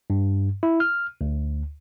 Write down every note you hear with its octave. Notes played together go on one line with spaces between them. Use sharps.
G2
E4
F6
D2